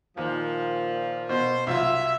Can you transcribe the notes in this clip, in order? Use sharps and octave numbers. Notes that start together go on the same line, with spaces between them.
D#2 A#2 F3
B2 C5
C2 F#3 F4 E5